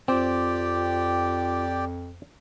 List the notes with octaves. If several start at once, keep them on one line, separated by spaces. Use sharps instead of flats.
F2 C4 F4 G4 D5 G5